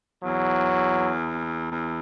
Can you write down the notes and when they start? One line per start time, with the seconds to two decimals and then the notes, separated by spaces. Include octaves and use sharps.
0.24 E2 F#3
1.71 E2